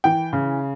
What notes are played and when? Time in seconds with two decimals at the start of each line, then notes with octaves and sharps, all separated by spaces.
0.04 E3 G5
0.33 C#3